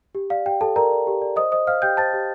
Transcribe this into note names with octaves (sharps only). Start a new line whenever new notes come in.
G4
D5 F5
G4 G5
G4 A4 A5
A#4 D5 A#5
D5
G4
D5
C5 D#5 D#6
C5 D#5 D#6
C5 F5 F6
G4 G5 G6
C5 A5 A6
G4